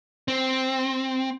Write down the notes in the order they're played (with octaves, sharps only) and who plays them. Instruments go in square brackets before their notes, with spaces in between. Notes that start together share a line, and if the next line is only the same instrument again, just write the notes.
[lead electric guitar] C4